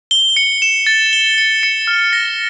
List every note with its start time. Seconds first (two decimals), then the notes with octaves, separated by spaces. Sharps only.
0.11 G7
0.37 C#7
0.62 E7
0.87 A6
1.13 G7
1.38 C#7
1.63 C#7
1.87 F6
2.13 A#6